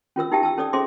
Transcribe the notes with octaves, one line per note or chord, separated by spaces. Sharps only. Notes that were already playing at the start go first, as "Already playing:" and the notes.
C#4 F4 A#4 E6
D#4 E4 G4 E5 G5 A5
A5 E6
C#4 A4 D5 D#6
C#4 G#4 C5 E5 C6 D6